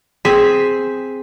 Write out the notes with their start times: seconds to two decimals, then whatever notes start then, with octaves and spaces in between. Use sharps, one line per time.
0.25 C4 G#4 B6